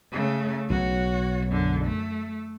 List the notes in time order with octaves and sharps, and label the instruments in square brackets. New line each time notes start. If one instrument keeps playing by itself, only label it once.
[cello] C#3 A3
[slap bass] B1 B2 [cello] F#4 C#5
[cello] F#2 D3
A3